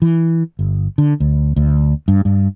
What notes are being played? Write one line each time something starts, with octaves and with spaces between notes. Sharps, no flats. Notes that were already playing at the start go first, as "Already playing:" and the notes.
E3
G1
D3
D2
D2
G2
G2